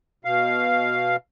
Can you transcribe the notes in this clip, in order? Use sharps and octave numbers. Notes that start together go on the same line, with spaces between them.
B2 F5